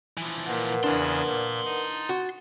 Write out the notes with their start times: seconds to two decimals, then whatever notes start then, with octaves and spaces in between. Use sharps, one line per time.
0.17 E3 F3
0.46 A#2 A#4 B4 F#5
0.84 E2 C#3 D4 A5 C6
1.26 A#2
1.65 D#4
2.09 F#4